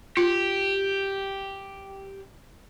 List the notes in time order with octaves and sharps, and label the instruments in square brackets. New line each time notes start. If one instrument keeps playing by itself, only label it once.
[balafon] F4 [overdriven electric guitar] G4